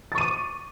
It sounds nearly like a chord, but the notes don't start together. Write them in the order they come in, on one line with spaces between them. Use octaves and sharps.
A6 C#6 D#7 D6